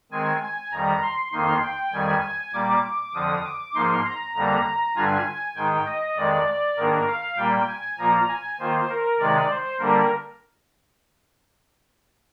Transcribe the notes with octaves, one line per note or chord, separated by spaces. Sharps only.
D#3 G#3 C4 G#5
G#5
F2 D#3 G3 A#5
C6
F2 D#3 A#3 D#4 C6
G5
F2 D#3 G3 G#5
A#2 G3 A#3 D6
F2 D3 F3 D#6
D6
G#2 F3 A#3 D#4 C6
A#5
F2 D3 G3 A#3
G2 D3 G3 D4 F4 G#5
G#2 D#3 G#3 D#4 G5
D#5
F2 D#3 G#3 D5
G#2 D#3 A#3 D4 A#4
F5
A#2 G3 A#3 G5
G#5
A#2 F3 A#3 F4 A#5
G#5
D#3 A#3 F4 C5
A#4
C3 D#3 G#3 D#4 D5
C5
D3 G3 A#3 D4 A#4